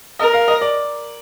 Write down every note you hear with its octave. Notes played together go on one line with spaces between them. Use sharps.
A#4 D#5
F5
D#5
D5